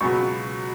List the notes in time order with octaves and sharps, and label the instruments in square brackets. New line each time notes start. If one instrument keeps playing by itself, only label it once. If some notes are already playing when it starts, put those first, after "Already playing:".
[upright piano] C#2 B2 F#3 B3 C#6